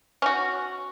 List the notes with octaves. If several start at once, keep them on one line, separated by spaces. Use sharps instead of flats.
C#4 F#4